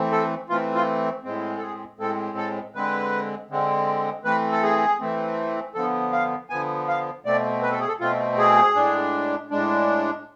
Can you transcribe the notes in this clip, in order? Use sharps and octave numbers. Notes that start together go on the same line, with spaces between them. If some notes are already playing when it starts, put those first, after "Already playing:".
Already playing: E3 A3 C4
A4
E3 A3 C4 F4
F4
A2 G#3 C4
A4
G#4
A2 G#3 C4 A4
A4
D3 G#3 C4 B4
D3 G#3 C4
E3 A3 C4 B4
A4
G#4
E3 A3 C4
D3 F3 B3 A4
F5
D3 F3 B3 G#5
F5
B2 A3 C4 D5
B4
A4
G#4
A4
B2 A3 C4 F4
G#4
A2 G#3 D4
A2 G#3 D4